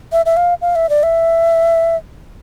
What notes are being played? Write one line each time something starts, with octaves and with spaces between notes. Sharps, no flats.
E5
E5
F5
F5
E5
D5
E5